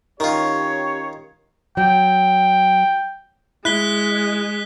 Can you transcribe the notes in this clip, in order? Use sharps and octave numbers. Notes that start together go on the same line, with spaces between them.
D#3 C#4 F4 G4 C#5
F#3 G5
G#3 E4 F#6 B6 G7